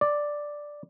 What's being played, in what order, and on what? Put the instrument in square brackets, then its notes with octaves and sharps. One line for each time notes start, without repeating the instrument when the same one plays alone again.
[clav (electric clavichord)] D5